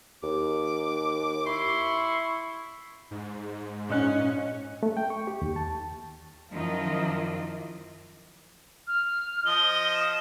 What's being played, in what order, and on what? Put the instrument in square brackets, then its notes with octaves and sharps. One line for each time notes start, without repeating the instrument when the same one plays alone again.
[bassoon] D#2 [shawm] D6
[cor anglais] E4 [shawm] C6 [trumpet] C#6
[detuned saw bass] G#2
[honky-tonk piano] A#1 D#5 F#6 [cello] C#4
[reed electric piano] A3
G5
C#6
G4
D#2
A5
[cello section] F#2 D#3 F3 E4 F4 D#5
[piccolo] F6
[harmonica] F3 D#5 D#6 [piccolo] G7
[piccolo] E7